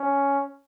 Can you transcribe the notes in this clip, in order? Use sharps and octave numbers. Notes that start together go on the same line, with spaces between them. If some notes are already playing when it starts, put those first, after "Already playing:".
Already playing: C#4